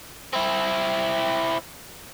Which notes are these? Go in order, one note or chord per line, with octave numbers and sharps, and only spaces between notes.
C4 E4